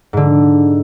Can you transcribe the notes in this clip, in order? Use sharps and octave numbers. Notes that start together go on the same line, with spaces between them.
G#2 D3